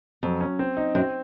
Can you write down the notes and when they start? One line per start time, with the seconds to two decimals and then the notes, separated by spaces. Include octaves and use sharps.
0.23 F2 F#3
0.41 C#4
0.59 C4
0.77 D#4
0.95 F#2 C4